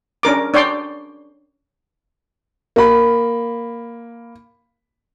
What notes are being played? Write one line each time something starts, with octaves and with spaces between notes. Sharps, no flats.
C#4 D4 A#4 D6
D4 C#5 D5 G5 C6
A#3 B5